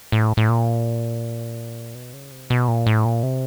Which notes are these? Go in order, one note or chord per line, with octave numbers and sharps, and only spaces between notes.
A2
A2
A#2
B2
C#3
C3
B2
A#2
A2
A#2
C3